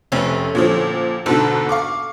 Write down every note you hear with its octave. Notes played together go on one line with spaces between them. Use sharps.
F1 A3 C4 C#4 B4
A#2 D3 F3
G#2 B2 D3 A4
F5 C#6 D6